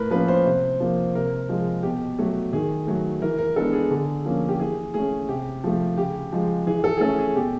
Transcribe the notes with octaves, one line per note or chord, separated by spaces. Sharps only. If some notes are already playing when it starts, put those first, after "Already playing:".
Already playing: A2 A#4 B4
F3 A#3 C#4 B4
C5
C3
F3 A#3
C3 A#4
F3 G#3
B2 G4
F#3 A3
D#3 G#4
F#3 A3
E3 A#4
A#4
G#3 B3 D4 A4
G#4
D3
F3 A#3 C#4
G4
E3 G#4
A3 C#4 G#4
C3 G4
F3 A3
C#3 G4
F3 G#3
E3 G#4
A4
G#4
A3 C#4 A4
G#4
B2 G4